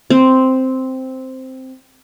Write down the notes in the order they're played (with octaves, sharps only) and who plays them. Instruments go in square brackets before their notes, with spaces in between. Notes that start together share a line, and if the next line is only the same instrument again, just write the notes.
[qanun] C4